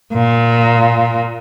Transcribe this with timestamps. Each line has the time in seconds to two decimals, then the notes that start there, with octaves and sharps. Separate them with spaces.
0.14 A#2